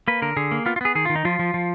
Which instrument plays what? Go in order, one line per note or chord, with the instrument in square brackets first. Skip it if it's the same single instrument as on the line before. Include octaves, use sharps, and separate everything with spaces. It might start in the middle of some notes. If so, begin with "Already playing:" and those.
[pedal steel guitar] A#3 B4
D3 A#4
D3 G#4
A#3
B3 F4
F4
B3 G#4
D#3 G#4
F4
D#3
D#4
F3 F4
F3
F3